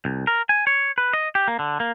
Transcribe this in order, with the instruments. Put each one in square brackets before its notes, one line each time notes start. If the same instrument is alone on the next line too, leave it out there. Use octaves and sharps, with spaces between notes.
[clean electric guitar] C2
A#4
G#5
C#5
B4
D#5
G4
A#3
D3
A#3